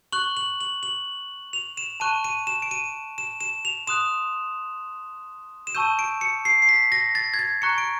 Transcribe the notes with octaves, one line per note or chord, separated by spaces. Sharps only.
C#6 F#6 F#7
F#7
F#7
F#7
F7
E7
A5 C#6 F#6 D#7
D#7
E7
D7
D#7
E7
E7
F7
C6 D#6 F#6 E7
E7
A5 C#6 E6 G6 D#7
D7
C#7
C7
C7
B6
A#6
A6
G#6
A6
A#5 C#6 F#6 C#7
D7